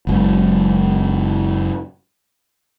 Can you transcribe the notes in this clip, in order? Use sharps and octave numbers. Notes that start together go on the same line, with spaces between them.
F#1 F#2 G#3